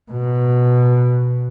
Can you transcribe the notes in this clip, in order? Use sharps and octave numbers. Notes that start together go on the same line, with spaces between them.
B2